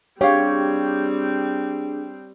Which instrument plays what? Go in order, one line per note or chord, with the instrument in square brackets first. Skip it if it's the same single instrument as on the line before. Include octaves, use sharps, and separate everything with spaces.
[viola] G3 C4 [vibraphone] D4 G#4 [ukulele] G4 F5 [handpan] C#5